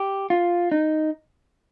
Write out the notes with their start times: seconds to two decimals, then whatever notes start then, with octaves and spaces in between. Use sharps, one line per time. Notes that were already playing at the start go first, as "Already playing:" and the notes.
Already playing: G4
0.30 F4
0.72 D#4